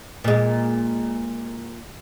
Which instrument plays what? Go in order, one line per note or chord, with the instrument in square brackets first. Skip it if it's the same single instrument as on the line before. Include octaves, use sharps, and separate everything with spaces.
[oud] A#2 G#3